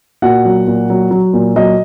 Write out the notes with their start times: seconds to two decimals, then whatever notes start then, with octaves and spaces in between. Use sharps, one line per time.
0.22 A#2 F#4 F#5
0.45 F#3
0.67 A#2
0.90 F#3
1.11 F#3
1.33 A#2
1.56 F#3 D#5